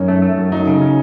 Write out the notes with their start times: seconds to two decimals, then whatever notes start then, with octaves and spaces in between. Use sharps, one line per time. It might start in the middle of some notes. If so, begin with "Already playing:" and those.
Already playing: F#2 C#4 D#4
0.08 A3
0.22 A3
0.38 F#2
0.52 F#3 D#4
0.67 C#3
0.81 C#4